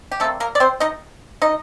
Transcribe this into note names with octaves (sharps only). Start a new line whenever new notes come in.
G4
C3 G3 A3 A#3 A4
A#3 A#4
D5
C4 C5
D#4 D#5
D#4 D#5